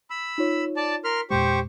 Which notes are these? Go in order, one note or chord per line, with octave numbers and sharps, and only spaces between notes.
B5 E6
D#4 F4 C#5
D5 A5
A#4 C6 F6 B6
E2 A#2 G#3 G4 C5 C#6